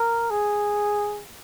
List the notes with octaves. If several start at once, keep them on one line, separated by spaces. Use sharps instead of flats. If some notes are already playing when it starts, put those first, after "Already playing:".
Already playing: A#4
G#4